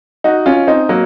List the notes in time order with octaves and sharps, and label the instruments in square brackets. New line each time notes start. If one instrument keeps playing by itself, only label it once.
[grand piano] D#4 F#4
C#4 F4
C4 D#4
F#3 A#3